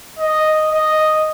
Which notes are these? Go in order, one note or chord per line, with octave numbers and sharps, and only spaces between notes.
D#5
D#5